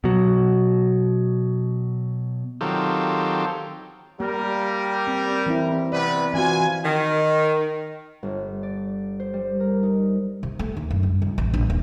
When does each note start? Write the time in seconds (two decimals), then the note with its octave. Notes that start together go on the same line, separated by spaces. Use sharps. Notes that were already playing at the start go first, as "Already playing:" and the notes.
0.04 B2 F#3
2.61 D#3 F#3 C4 F4 G4 A4
4.20 G3 A#3 G4 A#4
5.07 C4
5.46 E3 C4 E4
5.92 C3 B3 B4 D5
6.34 C3 E3 C4 F4 F#4 G#5
6.85 D#3
8.23 G1
8.63 D5
9.20 C5
9.33 G3
9.60 A#4
9.83 D#4
10.43 C3
10.59 A3
10.77 D#2
10.91 F#2
11.03 G2
11.22 C#2
11.38 A1
11.54 A#1
11.70 D#1